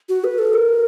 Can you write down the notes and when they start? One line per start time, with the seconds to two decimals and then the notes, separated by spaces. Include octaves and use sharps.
0.09 F#4
0.24 B4
0.39 A4
0.53 A#4